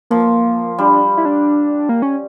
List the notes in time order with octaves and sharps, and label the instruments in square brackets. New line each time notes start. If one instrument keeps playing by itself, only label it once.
[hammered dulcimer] F3 [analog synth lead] A#3
[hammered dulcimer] G3 [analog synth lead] D4
[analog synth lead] E4
D4
A#3
C#4